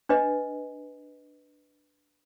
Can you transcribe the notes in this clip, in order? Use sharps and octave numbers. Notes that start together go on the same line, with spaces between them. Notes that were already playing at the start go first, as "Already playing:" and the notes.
D4 B4 D#5